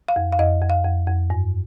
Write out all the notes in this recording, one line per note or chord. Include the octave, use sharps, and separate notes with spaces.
F5
F2
F5
F2 D#5
F2
F5
F2
F2
G2